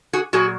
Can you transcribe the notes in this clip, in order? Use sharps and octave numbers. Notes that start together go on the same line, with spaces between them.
F#4 G#4
A#2 F#3 F#4 G#4